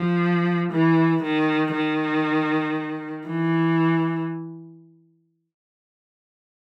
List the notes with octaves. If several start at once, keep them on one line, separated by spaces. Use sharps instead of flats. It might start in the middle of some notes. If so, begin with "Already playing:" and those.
Already playing: F3
E3
D#3
D#3
E3